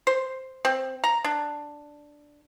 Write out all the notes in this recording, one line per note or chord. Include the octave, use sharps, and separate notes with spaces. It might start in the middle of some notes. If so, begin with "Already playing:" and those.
C5
C4
A#5
D4